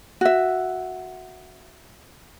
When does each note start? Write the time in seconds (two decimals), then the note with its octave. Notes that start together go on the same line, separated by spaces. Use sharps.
0.21 F#4 E5